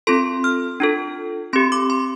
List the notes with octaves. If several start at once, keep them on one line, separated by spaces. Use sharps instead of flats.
C4 F4 A4 C6
F6
D4 F4 A4
C4 G4 C6
D6
C6